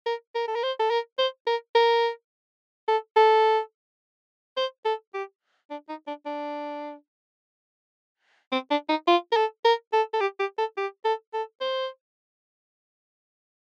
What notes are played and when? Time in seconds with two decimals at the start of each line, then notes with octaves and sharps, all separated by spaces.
0.06 A#4
0.35 A#4
0.48 A4
0.55 A#4
0.63 C5
0.79 A4
0.90 A#4
1.19 C5
1.47 A#4
1.75 A#4
2.88 A4
3.17 A4
4.57 C5
4.85 A4
5.14 G4
5.70 D4
5.89 D#4
6.07 D4
6.26 D4
8.52 C4
8.71 D4
8.89 D#4
9.08 F4
9.32 A#4
9.36 A4
9.65 A#4
9.93 A4
10.13 A4
10.21 G4
10.39 G4
10.58 A4
10.77 G4
11.05 A4
11.34 A4
11.61 C5